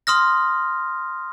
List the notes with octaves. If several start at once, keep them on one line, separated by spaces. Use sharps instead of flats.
C6 D#6 F6 A#6